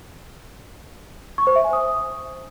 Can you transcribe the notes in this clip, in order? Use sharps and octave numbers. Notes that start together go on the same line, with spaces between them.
C#6
C5
E5
G#5
D#6